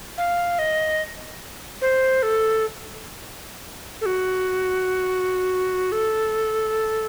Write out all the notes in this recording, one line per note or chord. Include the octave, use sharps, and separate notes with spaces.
F5
D#5
C5
A4
A4
F#4
A4